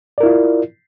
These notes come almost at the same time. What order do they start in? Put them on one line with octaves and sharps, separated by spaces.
D5 A#4 E4 F4